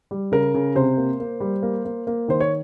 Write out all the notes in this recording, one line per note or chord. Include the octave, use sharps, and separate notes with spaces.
G3
C#3 A#4
C#3
C3 C5
A#3
A#3
G3
A#3
A#3
A#3
D#3 C5
C#5